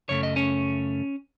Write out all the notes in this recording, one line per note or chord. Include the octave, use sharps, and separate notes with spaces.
F#2 C#3 A3 C#5
D#5
C#4 C#5